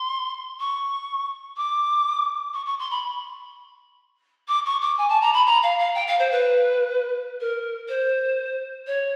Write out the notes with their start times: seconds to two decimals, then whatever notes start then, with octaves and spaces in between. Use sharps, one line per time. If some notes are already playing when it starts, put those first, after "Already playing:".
Already playing: C6
0.59 C#6
1.56 D6
2.54 C#6
2.66 C#6
2.79 C6
2.90 B5
4.48 D6
4.65 C#6
4.81 D6
4.98 G#5
5.09 A5
5.21 A#5
5.33 B5
5.46 A#5
5.63 F5
5.78 F5
5.95 G5
6.07 F5
6.19 C5
6.31 B4
7.40 A#4
7.88 C5
8.87 C#5